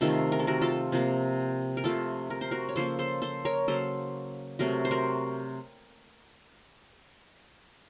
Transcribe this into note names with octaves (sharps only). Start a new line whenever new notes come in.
C3 D#3 A3 F4 A4
A#4
A4
F#4 A#4
F4 A4
C3 F3 A#3
A#4
C3 F3 A3 F4 A4
A#4
C5
F#4 A#4
C#5
C#3 F3 A#3 A4 C5
A4 C5
A4 C5
A#4 C#5
C#3 F#3 A#3 A4 C5
C3 F#3 A3 F#4 A#4
C5
F#4 A#4